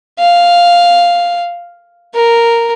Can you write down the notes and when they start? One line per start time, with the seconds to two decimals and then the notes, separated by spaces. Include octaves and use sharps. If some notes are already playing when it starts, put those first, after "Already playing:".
0.19 F5
2.15 A#4